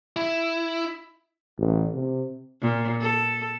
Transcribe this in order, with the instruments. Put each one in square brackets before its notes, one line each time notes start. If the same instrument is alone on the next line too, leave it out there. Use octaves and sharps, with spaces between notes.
[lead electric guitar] E4
[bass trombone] A1
C3
[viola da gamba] A#2
A4